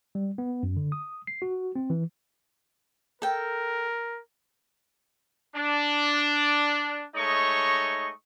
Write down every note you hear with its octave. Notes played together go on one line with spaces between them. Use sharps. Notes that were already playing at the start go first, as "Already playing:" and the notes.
G3
B3
F#2
D3
D#6
C7
F#4
C4
E3
A4 A#4 G5
D4
G#3 A3 D#4 C#5 D#5 C#6